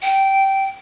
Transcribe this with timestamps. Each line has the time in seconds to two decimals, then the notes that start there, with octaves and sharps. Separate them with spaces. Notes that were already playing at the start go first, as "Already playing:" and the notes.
0.02 G5